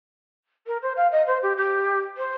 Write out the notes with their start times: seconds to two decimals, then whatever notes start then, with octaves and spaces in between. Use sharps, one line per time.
0.66 A#4
0.82 C5
0.96 F5
1.11 D#5
1.27 C5
1.42 G4
1.57 G4
2.17 C5